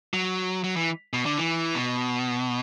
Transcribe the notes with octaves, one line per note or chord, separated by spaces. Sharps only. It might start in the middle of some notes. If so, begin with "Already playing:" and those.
F#3
F#3
E3
B2
D3
E3
B2